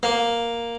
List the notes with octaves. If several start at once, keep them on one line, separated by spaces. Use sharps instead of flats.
A#3